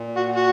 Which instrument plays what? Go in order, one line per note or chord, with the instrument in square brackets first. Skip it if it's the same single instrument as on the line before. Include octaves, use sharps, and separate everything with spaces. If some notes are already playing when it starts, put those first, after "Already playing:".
Already playing: [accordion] A#2
[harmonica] F#4
F#4